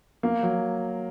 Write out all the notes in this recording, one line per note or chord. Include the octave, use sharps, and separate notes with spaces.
A#3
F#3